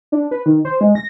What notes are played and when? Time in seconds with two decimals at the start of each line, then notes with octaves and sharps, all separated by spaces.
0.12 D4
0.31 B4
0.46 D#3
0.65 C5
0.81 G#3
0.95 A#6